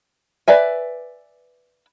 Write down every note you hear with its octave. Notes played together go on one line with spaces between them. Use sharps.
B4 D5 E5 G#5